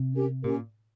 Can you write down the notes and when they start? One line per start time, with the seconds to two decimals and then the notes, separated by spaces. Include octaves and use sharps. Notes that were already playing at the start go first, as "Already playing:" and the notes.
Already playing: C3
0.13 C#4 G4 A#4
0.43 A#2 C#4 G4 A#4